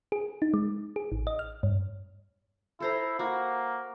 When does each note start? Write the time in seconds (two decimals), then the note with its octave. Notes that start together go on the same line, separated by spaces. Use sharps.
0.12 G#4
0.42 D#4
0.54 G#3
0.96 G#4
1.12 A1
1.27 D#5
1.39 F6
1.63 G2
2.80 E4 A4 C5 A#5
3.19 A#3 F#4